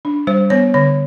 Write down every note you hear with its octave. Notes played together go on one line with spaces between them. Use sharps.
D4
G3 C5
B3 C#5
D3 C#5